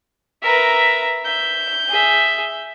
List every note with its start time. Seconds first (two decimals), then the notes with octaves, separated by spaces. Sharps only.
0.43 A#4 B4 E5 A#5
1.25 E5 G6
1.89 G#4 E5